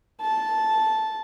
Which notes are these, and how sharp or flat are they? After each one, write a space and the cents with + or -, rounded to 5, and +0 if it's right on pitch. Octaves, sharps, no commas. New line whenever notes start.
A5 -10